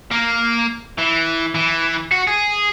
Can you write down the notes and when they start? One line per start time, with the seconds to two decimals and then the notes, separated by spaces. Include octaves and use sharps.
0.11 A#3
0.98 E3
1.55 E3
2.11 F#4
2.27 G#4